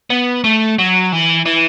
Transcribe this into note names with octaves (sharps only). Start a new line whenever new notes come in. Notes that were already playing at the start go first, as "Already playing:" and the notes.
B3
A3
F#3
E3
E3